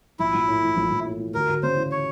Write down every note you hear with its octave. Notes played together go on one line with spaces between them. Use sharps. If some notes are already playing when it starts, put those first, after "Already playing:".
A#1 E4
A#1
A2
E3
A#1
A#1
A2
E3
D2 A#4
D2
C#3 C5
E3
C#5